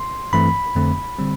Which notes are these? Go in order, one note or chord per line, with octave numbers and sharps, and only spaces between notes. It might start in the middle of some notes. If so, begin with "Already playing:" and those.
Already playing: C6
G2 E3 A3 C4 B5
F2 D3 A3 C4
D3 G3 C4